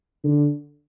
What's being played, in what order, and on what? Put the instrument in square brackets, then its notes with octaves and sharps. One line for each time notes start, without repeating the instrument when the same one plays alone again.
[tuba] D3